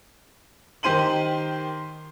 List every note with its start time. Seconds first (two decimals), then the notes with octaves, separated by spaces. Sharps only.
0.83 D#3 G4 C5 C6 D#7 F#7